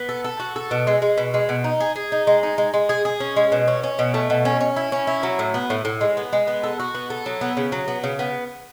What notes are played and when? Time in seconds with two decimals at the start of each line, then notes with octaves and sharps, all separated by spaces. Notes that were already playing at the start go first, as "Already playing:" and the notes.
Already playing: B3
0.09 A4
0.24 A4
0.40 F#4
0.56 A4
0.71 B2
0.87 G#3
1.02 G#3
1.18 B2
1.34 G#3
1.49 B2
1.64 D#4
1.80 G#4
1.96 G#4
2.12 D#4
2.27 G#3
2.43 D#4
2.58 G#3
2.74 G#3
2.89 G#4
3.05 G#4
3.20 C#4
3.36 G#3
3.52 B2
3.68 C#4
3.83 C#4
3.99 B2
4.14 A3
4.30 B2
4.45 C#4
4.61 C#4
4.76 E4
4.92 C#4
5.07 E4
5.23 F#3
5.39 A2
5.54 B3
5.70 A2
5.85 A2
6.01 G#3
6.17 B3
6.33 G#3
6.47 B3
6.63 A4
6.79 F#4
6.95 B3
7.10 A4
7.26 F#3
7.41 B3
7.57 C#3
7.72 F#3
7.88 B3
8.04 C#3
8.19 B3